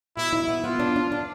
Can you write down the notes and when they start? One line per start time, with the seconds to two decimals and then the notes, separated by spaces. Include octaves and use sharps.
0.17 B2 E4
0.33 E4
0.48 B3
0.64 B3 F4
0.79 D4
0.96 D4
1.12 D4